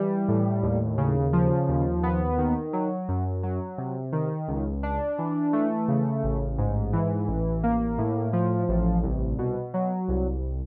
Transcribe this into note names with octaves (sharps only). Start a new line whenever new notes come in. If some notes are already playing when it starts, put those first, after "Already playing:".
Already playing: E3 G3
A2
D#2
C#3
F3
D#2
B3
D#3
F#3
F#2
F#3
C3
D#3
C#2
D4
E3
A3
C#3
A1
G#2
E3
A1
A#3
A2
F3
A1
C2
B2
F#3
C2